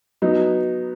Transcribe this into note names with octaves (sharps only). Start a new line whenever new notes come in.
F#3 B3 D#4